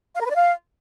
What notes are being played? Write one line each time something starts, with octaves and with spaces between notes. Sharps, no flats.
F5
A#4
B4
D5
F5